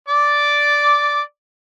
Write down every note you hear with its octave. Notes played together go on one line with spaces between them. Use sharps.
D5 D6